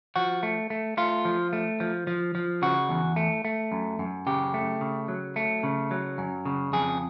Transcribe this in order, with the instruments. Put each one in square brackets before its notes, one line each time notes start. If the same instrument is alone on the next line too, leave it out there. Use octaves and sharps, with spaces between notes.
[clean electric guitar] F3 F#4
A3
A3
A3 F4
F3
A3
F3
F3
F3
C#3 F#4
E2
A3
A3
F#2
F#2
C#3 G4
A3
C#3
F#3
A3
C#3
F#3
F#2
C#3
F2 G#4